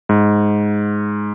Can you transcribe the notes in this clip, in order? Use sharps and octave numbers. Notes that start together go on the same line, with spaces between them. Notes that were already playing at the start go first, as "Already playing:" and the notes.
G#2